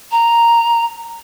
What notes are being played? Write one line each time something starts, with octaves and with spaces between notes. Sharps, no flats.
A#5